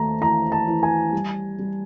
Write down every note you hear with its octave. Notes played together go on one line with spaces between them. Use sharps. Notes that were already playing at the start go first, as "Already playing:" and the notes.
Already playing: D#2 A3 A5 A#5
E3 A#5
A5
E3
G#5
G3
G3